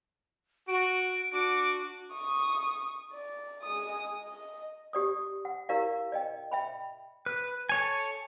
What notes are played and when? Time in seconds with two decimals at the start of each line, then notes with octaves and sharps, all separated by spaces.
0.68 F#4 D7
1.33 D4 F#4 D6
2.13 C#6 D#6
3.12 D5
3.63 G#3 D#6
4.24 D#5
4.93 G4 D5 D#6
5.45 F#5
5.69 E4 G4 A#4 D5 F5
6.12 D5 D#5 G5
6.52 E5 G5 B5
7.26 B4
7.69 A4 C#5 G#5